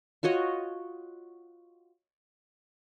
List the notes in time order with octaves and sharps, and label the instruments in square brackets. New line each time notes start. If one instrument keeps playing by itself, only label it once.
[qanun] F4 F#4 C#5 D#5